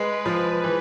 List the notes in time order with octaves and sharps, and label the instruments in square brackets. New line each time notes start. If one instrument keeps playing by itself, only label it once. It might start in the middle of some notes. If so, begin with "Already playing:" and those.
Already playing: [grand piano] G#3 [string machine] B4
[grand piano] F3
E3